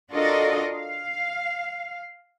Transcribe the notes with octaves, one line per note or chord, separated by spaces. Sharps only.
D4 F4 F#4 A4 A#4 D#5
F5